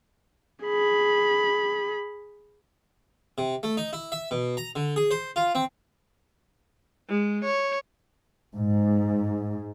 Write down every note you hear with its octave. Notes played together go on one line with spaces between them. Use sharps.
G#4 B5
C3
A3
D#4
E4
E5
B2
A#5
D3
G#4
C5
F4
C4
G#3
C#5
G#2